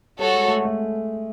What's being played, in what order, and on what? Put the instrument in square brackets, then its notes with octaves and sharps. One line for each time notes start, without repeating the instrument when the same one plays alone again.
[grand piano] G3 [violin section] F#4 A4 C#5
[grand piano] G#3
A3
G#3
A3